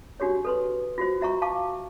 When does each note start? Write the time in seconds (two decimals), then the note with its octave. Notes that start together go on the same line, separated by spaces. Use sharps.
0.20 D4 F#4 G4 C#5
0.45 A4 B4 C6
0.98 F4 F#4 C5
1.21 F#4 E5 A#5 C#6
1.42 F5 A5 C#6 D6